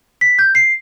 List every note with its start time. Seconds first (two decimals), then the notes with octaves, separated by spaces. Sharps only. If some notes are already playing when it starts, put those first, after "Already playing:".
0.21 B6
0.39 G6
0.55 C7